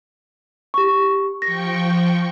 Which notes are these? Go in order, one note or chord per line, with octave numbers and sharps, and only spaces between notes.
G4 C#6
F3 G5 C#6 A#6